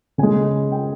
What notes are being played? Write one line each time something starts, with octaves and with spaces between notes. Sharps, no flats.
C#3 G#3 G#5
G5